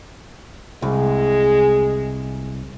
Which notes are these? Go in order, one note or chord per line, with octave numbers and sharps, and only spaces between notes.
C2 G#3